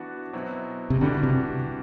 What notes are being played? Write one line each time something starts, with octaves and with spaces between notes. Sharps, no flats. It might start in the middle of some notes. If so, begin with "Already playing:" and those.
Already playing: E3 B3 D4 F#4
B2 F#3 C4 E4
C3
D3 E3 G3 D4 F#4
C3